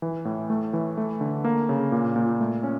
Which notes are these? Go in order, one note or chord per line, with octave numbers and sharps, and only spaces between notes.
E3
A2
A3
E3
A3
D3
A#3
C#3
A#2
A#2
A3
C#4